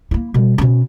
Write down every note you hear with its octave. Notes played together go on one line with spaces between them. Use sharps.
A#3 E4
B2 G3
B2 C#4